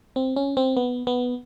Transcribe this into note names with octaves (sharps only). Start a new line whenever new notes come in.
C4
C#4
C4
B3
B3